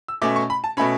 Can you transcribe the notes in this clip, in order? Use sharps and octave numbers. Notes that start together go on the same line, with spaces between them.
E6
B2 A3 C#4 D6
C#6
B5
A5
B2 A3 C#4 B5